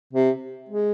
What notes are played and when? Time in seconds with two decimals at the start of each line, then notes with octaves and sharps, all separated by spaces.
0.13 C3
0.69 G#3